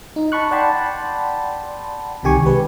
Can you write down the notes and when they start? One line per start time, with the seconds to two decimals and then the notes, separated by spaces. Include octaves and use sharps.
0.16 D#4
0.32 A5 B5 C#6 F#6
0.51 D5 F#5 G5 A5 B5 C6
2.23 C2 C3 D#3 G4 G#5 C#6
2.46 G#3 B4